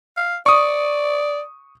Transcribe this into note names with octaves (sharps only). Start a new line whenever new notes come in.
F5
D5 C#6 D#6